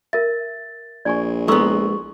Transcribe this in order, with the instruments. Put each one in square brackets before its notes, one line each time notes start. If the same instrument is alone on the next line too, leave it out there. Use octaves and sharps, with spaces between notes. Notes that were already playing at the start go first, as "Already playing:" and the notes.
[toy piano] A#4 E5 [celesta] A6
[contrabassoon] A#1 [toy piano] D5 G#5 C#6
[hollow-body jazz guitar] G#3 B3 [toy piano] E4 A4 E6 [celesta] C#6